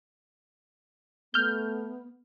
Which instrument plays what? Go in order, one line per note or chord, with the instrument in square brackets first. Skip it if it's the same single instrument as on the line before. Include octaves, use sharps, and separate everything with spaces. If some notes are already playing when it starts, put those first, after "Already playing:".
[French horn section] A3 [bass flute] B3 [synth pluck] F6 G6